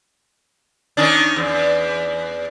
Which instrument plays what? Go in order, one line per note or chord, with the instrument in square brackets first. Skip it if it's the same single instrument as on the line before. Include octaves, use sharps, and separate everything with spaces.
[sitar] D#3 C#4 D4
E2